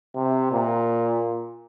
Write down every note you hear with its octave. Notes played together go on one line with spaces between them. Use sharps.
C3
A#2